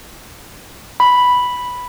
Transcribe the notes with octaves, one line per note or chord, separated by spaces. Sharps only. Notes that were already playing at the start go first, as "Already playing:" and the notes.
B5